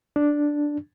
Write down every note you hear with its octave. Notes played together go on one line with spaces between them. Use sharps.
D4